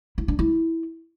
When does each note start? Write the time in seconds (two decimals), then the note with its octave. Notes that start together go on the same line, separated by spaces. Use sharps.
0.18 E4
0.28 D4
0.39 E4